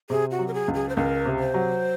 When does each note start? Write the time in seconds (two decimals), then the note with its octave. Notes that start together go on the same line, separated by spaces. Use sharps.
0.10 C3 G#4
0.31 F#4
0.39 F#3
0.48 A#4
0.54 G#4
0.68 C#2
0.75 G#4
0.89 C5
0.97 C#2 A#4
1.26 C3
1.39 C5
1.54 F#3